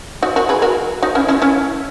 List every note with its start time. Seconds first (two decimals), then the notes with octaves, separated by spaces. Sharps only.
0.22 D#4 F#4
0.36 F#4 A#4
0.49 G#4 B4
0.62 F#4 A#4
1.02 D#4 F#4
1.15 C#4 E4
1.28 C#4 E4
1.42 C#4 E4